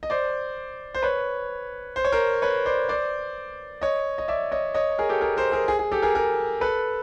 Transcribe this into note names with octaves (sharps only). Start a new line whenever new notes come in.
D#5
C5 D5
C5
B4 C#5
C5
C#5
A#4 C5
B4 C#5
C5 D5
C5 D5
C#5 D#5
D#5
D5 E5
C#5 D#5
C#5 D#5
G#4 A#4
G4 A4
G#4 A#4
A#4 C5
G#4 A#4
G#4
G#4
G4 A4
G#4 A#4
G#4 A#4
A4 B4